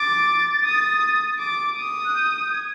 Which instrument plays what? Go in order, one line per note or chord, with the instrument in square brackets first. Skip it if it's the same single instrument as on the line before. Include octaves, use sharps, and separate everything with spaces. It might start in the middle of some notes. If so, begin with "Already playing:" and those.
Already playing: [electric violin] D6 [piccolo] A6
[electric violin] D#6
D6
D#6
[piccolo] F#6
G6
G#6